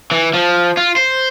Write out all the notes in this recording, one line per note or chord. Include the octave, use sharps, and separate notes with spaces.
E3
F3
F4
C5